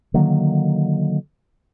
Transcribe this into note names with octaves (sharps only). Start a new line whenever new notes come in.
D3 D#3 F#3 A#3